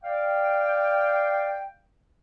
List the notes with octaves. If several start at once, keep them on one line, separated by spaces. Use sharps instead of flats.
D5 F5 G5